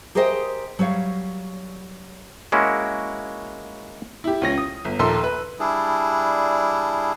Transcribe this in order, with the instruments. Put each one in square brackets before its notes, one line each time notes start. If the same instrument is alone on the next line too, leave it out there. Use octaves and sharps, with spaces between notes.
[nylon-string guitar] G4 G#4 A#4 C5 D#5 G5
F#3 G3 C#5 F5
[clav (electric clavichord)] G#3 A#3 C#4 E4 F#4
[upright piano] E4 G4
C#2 C#4 A#6
D#6
G1
A#1 D#2 A4 A#4 C6 E6
B4
[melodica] G3 D4 E4 G#4